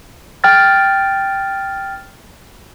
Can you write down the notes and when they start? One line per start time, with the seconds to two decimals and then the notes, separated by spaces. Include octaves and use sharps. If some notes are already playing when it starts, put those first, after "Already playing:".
0.44 G5 F6 A6